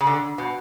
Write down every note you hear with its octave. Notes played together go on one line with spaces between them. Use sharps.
C#3
D3
B2